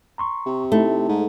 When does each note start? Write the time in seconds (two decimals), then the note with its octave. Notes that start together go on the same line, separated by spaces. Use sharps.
0.18 A#5 C6 C#6
0.46 C3
0.72 A3 D#4 E4
1.08 G#2